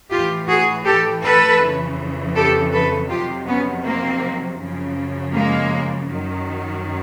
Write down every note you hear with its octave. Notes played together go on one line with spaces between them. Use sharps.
A2 E3 F4 G4
F#4 G#4
G4 A4
A4 B4
F2 C#3 E3
G4 A4
A4 B4
F2 C3 D#3 F#3 F4 G4
B3 C#4
A#3 C4
F#2 C#3 F3
G#3 A#3
F#2 D#3 F#3